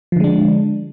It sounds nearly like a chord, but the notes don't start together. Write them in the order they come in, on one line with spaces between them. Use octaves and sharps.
F3 D3 G#3 D4